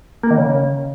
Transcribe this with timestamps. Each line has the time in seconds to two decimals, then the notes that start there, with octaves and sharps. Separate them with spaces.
0.23 A#3
0.31 D#3
0.38 C#3